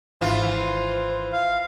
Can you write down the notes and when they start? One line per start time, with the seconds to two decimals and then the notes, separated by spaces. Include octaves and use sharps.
0.21 G#1 E3 F4 C5
1.33 F5